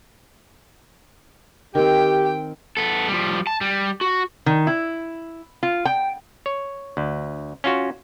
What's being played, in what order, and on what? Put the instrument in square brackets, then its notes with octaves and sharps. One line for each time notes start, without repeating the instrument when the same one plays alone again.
[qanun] D#3 C4 [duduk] G4 [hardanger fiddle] G5
[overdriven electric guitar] B3 A4
F3 G3
A5
G3
F#4
[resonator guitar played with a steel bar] D#3
E4
F4
G5
[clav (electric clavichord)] C#5
D2
C#4 F4 F#4